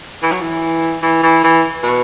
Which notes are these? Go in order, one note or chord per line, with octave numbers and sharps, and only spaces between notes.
E3
F#3
E3
E3
E3
E3
B2